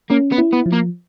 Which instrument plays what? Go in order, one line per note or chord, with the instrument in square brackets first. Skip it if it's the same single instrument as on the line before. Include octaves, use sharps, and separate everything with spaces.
[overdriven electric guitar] A#3 [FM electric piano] C#4
[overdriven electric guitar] B3
[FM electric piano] E4
[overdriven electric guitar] B3
[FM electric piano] F3
[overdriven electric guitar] A#3